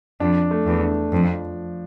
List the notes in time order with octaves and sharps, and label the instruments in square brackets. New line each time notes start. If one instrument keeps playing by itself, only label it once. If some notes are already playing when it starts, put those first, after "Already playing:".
[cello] F2 [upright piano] D4
[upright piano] A3
[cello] E2
[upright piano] D4
[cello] F2 [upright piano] F3